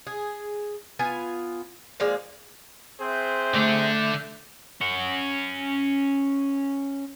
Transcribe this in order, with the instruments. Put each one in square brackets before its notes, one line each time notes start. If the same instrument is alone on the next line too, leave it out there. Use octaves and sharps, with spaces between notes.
[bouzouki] G#4
B3 F4 G#5
F3 G#3 A#3 D5
[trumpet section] C4 G#4 C5 [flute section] E5 F#6 G6
[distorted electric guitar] D3 D4 [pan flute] A3
[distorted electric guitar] C#4 F#5